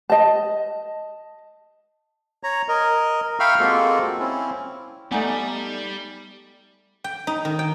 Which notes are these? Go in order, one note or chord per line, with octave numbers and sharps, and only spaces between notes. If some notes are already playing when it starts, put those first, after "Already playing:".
D#5 A5
C#5 A#5
A#4 D#5
E5 F5 G5 B5 C#6 F6
G#3 A#3 C4 F4 F#4 A4
C4 C#4 E4
G3 A3 B3 D#4 D5 F#5 G#5 A#5
G5
D#4
D#3
G5